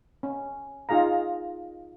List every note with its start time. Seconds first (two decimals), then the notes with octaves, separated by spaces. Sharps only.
0.23 C#4
0.89 D#4 F4 G#4 F5 A#5